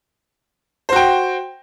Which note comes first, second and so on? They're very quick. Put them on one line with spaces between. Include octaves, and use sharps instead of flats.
C5 F#4 G5